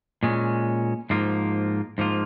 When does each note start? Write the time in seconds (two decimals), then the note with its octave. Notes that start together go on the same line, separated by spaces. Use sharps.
0.23 A#2 G#3 C#4
1.10 G#2 F3 A#3 F4
1.98 G#2 F3 A#3 F4